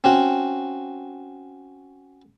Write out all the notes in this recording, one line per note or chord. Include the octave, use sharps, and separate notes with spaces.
C4 C#4 F#4